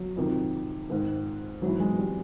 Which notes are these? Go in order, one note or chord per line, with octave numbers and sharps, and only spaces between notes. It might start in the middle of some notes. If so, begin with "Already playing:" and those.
Already playing: F#3
F2 C3 D#3
G#2 D#3
G#2 E3 F#3
G#3
G3